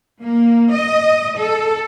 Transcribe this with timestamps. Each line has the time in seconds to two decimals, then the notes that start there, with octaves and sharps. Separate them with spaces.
0.22 A#3
0.71 D#5
1.38 A4